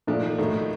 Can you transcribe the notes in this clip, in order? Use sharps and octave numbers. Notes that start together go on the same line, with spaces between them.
A#2 F3 A3 D4
D#3
A2 D#3 A3 D#4